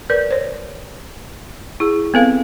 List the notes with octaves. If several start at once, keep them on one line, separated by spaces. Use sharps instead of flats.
A#4 B4 D5
C5 C#5
E4 G#4
B3 C4 A4 B4 F5